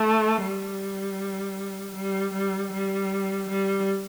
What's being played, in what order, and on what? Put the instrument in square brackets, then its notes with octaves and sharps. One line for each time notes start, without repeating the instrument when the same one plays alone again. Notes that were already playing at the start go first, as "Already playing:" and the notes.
Already playing: [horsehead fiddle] A3
G3
G3
G3
G3
G3